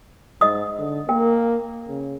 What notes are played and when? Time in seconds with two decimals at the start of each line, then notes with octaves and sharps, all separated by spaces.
0.41 G#2 D#5 D#6
0.79 D3
1.09 A#3 A#4 G5
1.88 C#3